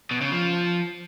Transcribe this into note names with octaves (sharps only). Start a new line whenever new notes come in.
B2
C#3
F3